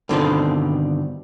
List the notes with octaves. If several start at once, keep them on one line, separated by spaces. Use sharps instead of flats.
G2 B2 D3 D#3 C4 F4